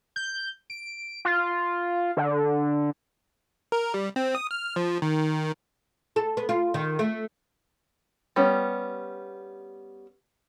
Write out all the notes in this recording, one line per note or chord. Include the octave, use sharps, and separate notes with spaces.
G6
D7
F4
D3
A#4
G3
C4
D#6
F6
F3
D#3
A4
B3
F4
D#3
A3
G3 B3 C#4